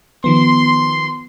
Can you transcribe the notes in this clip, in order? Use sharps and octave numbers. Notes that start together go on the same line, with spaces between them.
D#3 F3 B3 C6